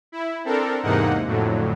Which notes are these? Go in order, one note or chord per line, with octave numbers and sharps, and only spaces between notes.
E4
C4 D4 A4 A#4
E2 G#2 C3 A#3 D#4 F#5
F2 A2 D3 F#3